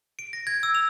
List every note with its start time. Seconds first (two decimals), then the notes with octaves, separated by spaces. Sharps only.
0.19 D7
0.33 A#6
0.47 G#6
0.63 E6
0.75 F7